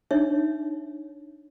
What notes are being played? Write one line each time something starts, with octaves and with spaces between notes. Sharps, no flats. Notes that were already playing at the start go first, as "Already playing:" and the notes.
D4 D#4 C#5 E5